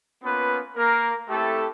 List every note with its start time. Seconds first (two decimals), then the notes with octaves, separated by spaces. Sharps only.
0.23 A#3 B3 C#4 F4 B4
0.76 A#3 A#4
1.30 A3 C4 E4 G4 A4